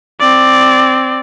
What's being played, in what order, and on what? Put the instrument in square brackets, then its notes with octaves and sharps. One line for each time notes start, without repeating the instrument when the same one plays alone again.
[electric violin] C4 D5